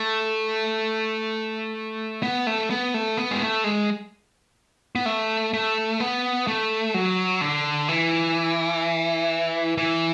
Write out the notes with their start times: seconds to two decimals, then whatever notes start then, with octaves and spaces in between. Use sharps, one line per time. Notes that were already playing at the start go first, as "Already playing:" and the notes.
Already playing: A3
2.23 B3
2.47 A3
2.70 B3
2.94 A3
3.17 B3
3.31 G#3
3.41 A3
3.64 G#3
4.95 B3
5.06 A3
5.53 A3
6.00 B3
6.47 A3
6.94 F#3
7.41 D3
7.89 E3
9.77 E3